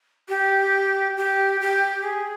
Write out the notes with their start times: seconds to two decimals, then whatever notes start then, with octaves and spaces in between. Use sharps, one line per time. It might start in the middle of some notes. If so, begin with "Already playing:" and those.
0.29 G4
1.17 G4
1.61 G4
2.03 G#4